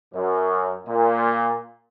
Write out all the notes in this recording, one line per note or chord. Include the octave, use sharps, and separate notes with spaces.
F#2
A#2